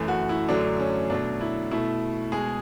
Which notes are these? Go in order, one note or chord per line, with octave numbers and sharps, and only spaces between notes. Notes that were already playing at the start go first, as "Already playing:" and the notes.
Already playing: F#2 E3 A3
F#4
E4
F#2 D3 F#3 A3 D4
C#4
B2 F#3 A3 D4
E4
B2 A3 E4
B2 G#3 G#4